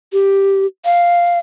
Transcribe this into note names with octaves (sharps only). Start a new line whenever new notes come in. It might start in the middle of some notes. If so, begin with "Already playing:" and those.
G4
F5